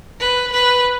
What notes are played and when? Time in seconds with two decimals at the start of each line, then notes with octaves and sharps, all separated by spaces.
0.20 B4
0.52 B4